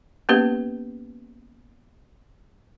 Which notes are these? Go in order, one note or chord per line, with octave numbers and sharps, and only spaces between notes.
A#3 B3 C#4 G4 B4